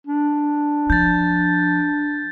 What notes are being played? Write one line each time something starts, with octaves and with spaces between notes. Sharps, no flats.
D4
F3 G6 A6